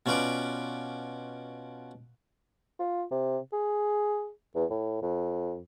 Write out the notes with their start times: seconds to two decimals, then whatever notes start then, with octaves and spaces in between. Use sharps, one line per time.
0.06 B2 C#4 F4 B4 D5 D6
2.79 F4
3.11 C3
3.53 G#4
4.55 E2
4.70 A2
5.02 F2